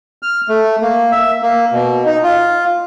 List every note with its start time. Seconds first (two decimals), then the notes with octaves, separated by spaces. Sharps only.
0.23 F6
0.49 A3
0.82 A#3
1.12 E5
1.42 A#3
1.72 B2
2.06 D#4
2.23 F4